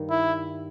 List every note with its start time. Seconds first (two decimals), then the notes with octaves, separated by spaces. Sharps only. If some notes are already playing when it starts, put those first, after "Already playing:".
Already playing: G2 D#3
0.11 E4